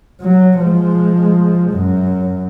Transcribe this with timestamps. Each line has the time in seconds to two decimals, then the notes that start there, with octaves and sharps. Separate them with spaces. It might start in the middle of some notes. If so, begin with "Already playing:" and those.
0.21 F#3
0.60 F3 G#3
1.71 F#2